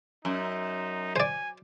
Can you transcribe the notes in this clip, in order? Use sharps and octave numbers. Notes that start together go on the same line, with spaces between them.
F#2 D#4
C5 D5 G#5